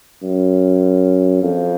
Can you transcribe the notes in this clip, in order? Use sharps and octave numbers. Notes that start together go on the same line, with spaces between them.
F#2
F2